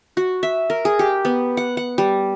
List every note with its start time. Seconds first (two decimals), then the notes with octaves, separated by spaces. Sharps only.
0.17 F#4
0.43 E5
0.70 A#4
0.85 G#4
0.99 G4
1.25 B3
1.57 F#5
1.77 F#5
1.98 G3